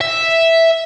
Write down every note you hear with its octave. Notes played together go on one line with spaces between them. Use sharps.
E5